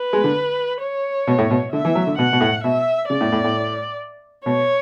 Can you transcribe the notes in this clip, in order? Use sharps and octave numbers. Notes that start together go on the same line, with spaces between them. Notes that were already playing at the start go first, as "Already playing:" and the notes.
Already playing: B4
G#3
D3
C#5
B2
A2
B2
D3 E5
E3
F#3
D3
B2 F#5
B2
A2
B2 E5
C#3 D5
A2
A2
A2
B2 C#5